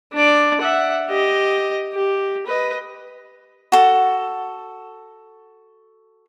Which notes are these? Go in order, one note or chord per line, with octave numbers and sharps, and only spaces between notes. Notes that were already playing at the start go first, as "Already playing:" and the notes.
D4 D5
E5 F#5
G4 D#5
G4
B4 D#5
F#4 A4